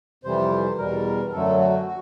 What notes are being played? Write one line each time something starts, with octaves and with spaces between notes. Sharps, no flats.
F2 C3 E3 G3 C5
E2 B2 G3 A#4
F#2 D3 F#3 A3 A4
F#4
F#4